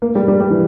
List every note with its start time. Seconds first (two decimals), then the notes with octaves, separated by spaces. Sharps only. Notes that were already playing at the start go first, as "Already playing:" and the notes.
0.02 A#3
0.15 G3
0.28 G3
0.40 G3
0.50 E3